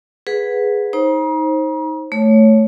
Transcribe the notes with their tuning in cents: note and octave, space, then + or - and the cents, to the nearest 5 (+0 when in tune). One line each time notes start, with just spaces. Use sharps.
G#4 +0 B4 +0 F#5 -20
D#4 +15 C5 +25 A#5 +40
A3 -5 C#5 +0